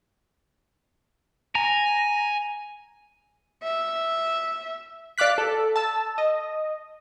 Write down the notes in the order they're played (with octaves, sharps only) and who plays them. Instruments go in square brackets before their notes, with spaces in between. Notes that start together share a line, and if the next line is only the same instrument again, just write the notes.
[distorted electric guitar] G#5 [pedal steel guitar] A#5
[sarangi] E5
[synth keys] D5 F5 D6 F#6 B6
A4
A5 E6
D#5